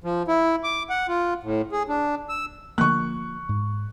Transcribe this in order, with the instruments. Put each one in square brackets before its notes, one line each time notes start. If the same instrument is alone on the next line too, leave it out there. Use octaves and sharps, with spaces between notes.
[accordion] F3
E4
D6
F#5
F4
A2
G#4
D4
E6
[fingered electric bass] D3 F3 A#3 [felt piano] C#6 F#6
[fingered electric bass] G#2